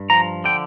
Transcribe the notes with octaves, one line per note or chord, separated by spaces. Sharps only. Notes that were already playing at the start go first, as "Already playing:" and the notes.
Already playing: G2
F3 A#5
D3 G5